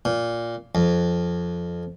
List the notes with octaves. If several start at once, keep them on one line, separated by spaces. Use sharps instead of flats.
A#2
F2